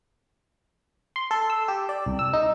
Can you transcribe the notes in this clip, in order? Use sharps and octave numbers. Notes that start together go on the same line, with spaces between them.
C6
A4
E6
G4
D5
C2
E6
D#4